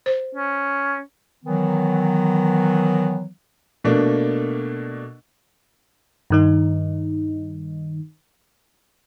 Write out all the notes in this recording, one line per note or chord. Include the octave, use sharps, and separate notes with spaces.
C5
C#4
D#3 E3 F#3 B3
B2 A3 A#3 D4
G2 D#3 D#4